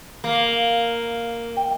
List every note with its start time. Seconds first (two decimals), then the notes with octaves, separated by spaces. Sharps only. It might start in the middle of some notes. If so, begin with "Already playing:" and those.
0.24 A#3
1.57 G5